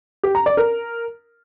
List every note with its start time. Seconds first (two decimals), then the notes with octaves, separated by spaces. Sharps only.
0.23 G4
0.35 A#5
0.46 D5
0.57 A#4